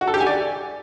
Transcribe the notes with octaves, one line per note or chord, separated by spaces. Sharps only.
F#4
A4
G4
G#5
D5